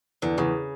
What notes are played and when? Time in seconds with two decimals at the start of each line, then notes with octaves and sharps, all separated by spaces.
0.22 E2 D3
0.38 E2 C#3